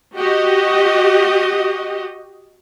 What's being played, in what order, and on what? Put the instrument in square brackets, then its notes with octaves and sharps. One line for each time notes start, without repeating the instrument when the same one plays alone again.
[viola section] F#4 G4 D#5